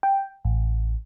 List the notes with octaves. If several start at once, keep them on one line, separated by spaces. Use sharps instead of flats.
G5
A1